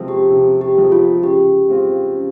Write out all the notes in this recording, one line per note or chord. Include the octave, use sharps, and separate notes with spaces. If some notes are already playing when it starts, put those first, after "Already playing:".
Already playing: C3 F3 G#3 C4
G4
C3
G4
F3 G#3 C4
F4
C#3 G4
G#3 C4 F4
C#3